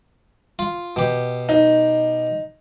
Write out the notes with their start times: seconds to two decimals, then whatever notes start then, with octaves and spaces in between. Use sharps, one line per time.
0.59 F4
0.96 B2 G4
1.49 D#4